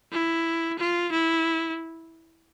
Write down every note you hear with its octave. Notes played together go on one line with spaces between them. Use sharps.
E4
F4
E4